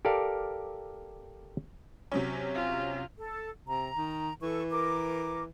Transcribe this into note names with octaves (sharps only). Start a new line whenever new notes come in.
G4 A4 A#4 D5 F5
C3 F#3 C#4
F4
A4
C3 A#5
D#3
E3 A4 C#6
A#4 D6